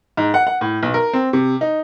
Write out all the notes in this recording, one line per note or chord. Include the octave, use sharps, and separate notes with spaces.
G#2
F#5
F#5
A2
B1
A#4
C4
C3
D#4